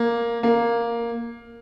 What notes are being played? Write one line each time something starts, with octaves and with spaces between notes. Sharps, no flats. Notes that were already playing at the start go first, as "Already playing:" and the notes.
Already playing: A#3
A#3